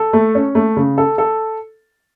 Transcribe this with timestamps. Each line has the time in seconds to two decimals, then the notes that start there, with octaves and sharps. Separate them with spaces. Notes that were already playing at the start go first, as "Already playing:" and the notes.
Already playing: A4
0.13 A3
0.35 C#4
0.55 A3
0.77 C#3
0.98 A4
1.18 A4